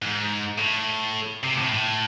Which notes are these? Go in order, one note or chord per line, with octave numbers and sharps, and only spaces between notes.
G#2
A2
C3
A2
A2